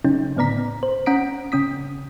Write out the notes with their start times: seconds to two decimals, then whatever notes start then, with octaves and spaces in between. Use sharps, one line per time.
0.05 C#3 F#3 C#4 D#4
0.36 A2 D3 B3 D5 A#5 B6
0.83 C5
1.06 C#4 F#5 A#5 D#6 B6 D7
1.52 C#3 C#4 D#6 B6